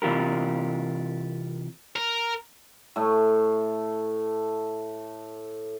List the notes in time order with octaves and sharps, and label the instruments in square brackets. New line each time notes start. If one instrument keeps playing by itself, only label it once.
[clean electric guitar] C3 E3 F4 G4 A#4
[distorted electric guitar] A#4
[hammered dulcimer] A2 A3